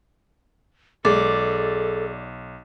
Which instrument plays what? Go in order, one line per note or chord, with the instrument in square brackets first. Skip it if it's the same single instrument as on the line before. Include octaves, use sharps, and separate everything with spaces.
[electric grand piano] B1 [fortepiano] G#3 [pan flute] A4 [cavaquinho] D5